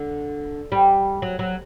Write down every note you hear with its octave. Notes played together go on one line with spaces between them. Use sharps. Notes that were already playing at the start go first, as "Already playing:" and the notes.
Already playing: D3
G3
F#3
F#3